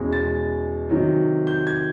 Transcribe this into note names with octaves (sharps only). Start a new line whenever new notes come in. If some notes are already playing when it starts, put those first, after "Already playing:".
Already playing: E2 B2 G#3 C#4
A6
C3 D#3 F#3
G6
G#6